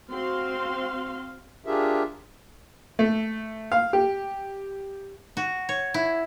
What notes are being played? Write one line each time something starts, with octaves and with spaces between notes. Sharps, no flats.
C4 F#4 F5 C6
D4 F4 G4 G#4 A#4 E5
A3
F5
G4
F#4
C#5
E4